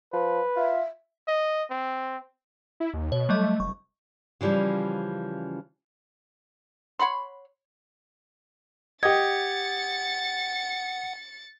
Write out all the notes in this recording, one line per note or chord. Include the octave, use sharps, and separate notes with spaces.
F3 B4
F4 E5
D#5
C4
E4
D#2
B2 C#5
F#3 G3 A3 D#5
F1 C#6
C#3 E3 F3 G3 C#4
C#5 F#5 B5 C6
G4 D#5 F#5 G#6 A6 C#7